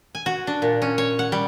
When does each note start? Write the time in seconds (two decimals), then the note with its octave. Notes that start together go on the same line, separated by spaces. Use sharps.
0.15 G#5
0.26 F#4
0.47 D4
0.62 A#2
0.82 C#4
0.98 C#5
1.19 F#5
1.32 G3